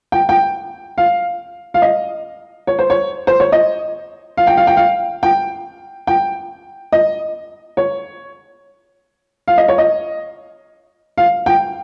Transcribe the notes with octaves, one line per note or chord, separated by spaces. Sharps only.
G5
G5
F5
F5
D#5
C#5
C5
C#5
C5
C#5
D#5
F5
G5
F5
G5
F5
G5
G5
D#5
C#5
F5
D#5
C#5
D#5
F5
G5